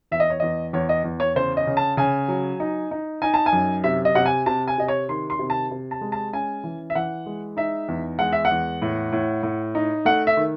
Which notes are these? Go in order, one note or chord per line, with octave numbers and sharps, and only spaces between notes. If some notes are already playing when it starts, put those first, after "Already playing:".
E2 E5
D#5
C#5
E2 D#5
E2 C#5
D#5
E2
C#5
C#3 C5
D#5
C#3
A5
C#3 G#5
F#3
D#4
D#4
D#4 G#5
A5
G#5
F#2
C3 E5
D#5
C3 F#5
G#5
C3 A5
G#5
C3 D#5
C#5
D#3 C6
C6
C3
A5
C3
A5
G#3
A5
C#4 G#5
E3
E5
E3 F#5
G#3
D#4 E5
E2
G#3 F#5
E5
F#5
E2
A2
A2
A2
D#4
A3 F#5
E5
D#3